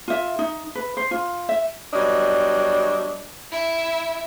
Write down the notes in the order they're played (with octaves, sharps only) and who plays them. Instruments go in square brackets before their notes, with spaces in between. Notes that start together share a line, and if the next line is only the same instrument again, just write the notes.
[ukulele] F4 E5
D#4
B4
C5
F4
E5
[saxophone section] F#3 G3 B3 D4 D#5
[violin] E4 E5